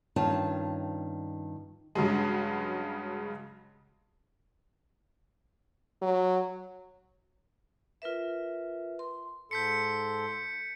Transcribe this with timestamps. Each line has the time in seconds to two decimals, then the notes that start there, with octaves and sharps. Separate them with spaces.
0.16 G2 D#3 C#4 F4 A5
1.95 G2 C#3 F#3 G#3
6.02 F#3
8.02 F4 A#4 B4 E5
8.99 C6
9.51 G#2 A4 C6 G6 B6 C#7